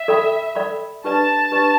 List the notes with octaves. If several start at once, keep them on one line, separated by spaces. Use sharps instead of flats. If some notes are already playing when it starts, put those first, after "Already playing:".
Already playing: E5
A4 D5 G5 B5
A4 D5 G5 B5
D4 G4 B4 D5 A5
D4 G4 B4 D5